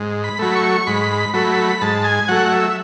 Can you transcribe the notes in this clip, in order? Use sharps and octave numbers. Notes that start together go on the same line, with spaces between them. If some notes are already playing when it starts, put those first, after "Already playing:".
Already playing: G#2
B5
F#3 A3 B5
C#6
G#2 B5
F#3 A3 B5
G#2 A5
G#5
F#3 A3 F#5
E5